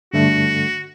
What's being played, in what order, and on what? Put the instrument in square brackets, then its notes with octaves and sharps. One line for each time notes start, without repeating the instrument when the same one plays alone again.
[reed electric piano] G2 D3 A3 [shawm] F#4